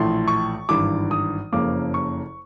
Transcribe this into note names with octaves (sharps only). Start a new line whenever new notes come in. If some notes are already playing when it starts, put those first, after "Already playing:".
Already playing: A#1 A2 E3 A3 C6
C#6
G#1 G2 E3 D6
D#6
F#1 F2 C#3 F3 A#3 D6
C#6